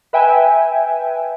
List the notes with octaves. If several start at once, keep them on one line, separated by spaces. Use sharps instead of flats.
B4 E5 G5 G#5